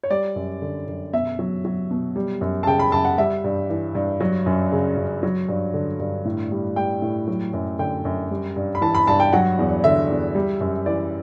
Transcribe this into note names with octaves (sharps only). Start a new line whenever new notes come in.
C#5
G3 D5
F#2
D3
F#2
B2 E5
F#3
F#3
B2
G3
F#2
A5
C#3 G5
B5
F#2 A5
F#5
G3 E5
G2
E3
G2
F#3
F#2
C#3
F#2
F#3
G2
D3
G2
A2
G3
G3 G5
A2
F#3
F#2
D3 G5
F#2
G3
G2
B5
E3 A5
B5
G2 A5
G5
F#3 F#5
E2
D3 E5
E2
G3
F#2
E3 D5